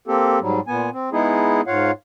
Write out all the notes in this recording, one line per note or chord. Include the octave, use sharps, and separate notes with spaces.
A#3 C4 G4 A4
G#2 F#3 G3
A#2 B3 G#5
C4
G#3 B3 D#4 E4 G#4
G#2 F4 C#5 F5 F#5